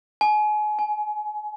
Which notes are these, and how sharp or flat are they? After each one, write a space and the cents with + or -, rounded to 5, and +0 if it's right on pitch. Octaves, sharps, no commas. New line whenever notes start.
G#5 +35
G#5 +10